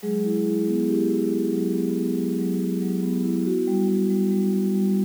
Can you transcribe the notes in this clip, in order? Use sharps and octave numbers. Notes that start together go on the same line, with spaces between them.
F#3 G#3 G#4
E4
E4
B3
E4 G4
E4
E4
F#3
B3
B3
F#3
F#3
F#3
F#3
B3
E4
B3 F#4
G3
G3
G3
G3
G3
G3